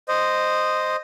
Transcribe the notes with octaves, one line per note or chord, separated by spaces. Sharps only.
C5 D#5